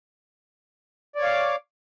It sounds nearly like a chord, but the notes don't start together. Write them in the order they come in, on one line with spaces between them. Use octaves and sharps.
D5 C#5 F5 D6